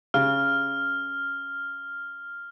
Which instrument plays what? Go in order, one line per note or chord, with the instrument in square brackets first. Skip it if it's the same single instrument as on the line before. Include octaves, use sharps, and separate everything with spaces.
[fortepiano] C#3 [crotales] F6